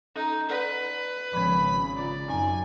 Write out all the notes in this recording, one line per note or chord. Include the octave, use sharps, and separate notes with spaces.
C#4 D#4 A4
A4 B4 D5 F#5
G#1 C#3 F3 B3 B5
C#4 F4 D5
F#2 C4 C#4 D#4 G#5